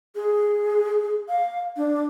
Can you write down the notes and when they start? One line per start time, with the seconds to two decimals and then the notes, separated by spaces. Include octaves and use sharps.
0.15 G#4
1.28 F5
1.77 D4